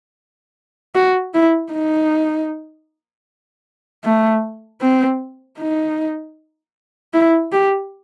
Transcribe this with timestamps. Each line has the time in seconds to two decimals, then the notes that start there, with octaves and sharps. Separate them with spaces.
0.95 F#4
1.34 E4
1.72 D#4
4.04 A3
4.82 C4
5.59 D#4
7.14 E4
7.53 G4